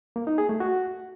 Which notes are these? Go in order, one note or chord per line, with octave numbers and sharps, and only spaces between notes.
A#3
D#4
G#4
A3
F#4